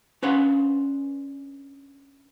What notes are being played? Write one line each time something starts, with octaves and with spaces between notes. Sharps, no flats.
C#4 D4 B4 C5 F5 F#5